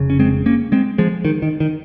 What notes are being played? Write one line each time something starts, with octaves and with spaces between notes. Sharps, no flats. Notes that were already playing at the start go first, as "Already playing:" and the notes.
Already playing: F1 C#3
C#4
G#3 C4
A#3 C#4
G#3 C4
F3 G#3
D#3
D#3
D#3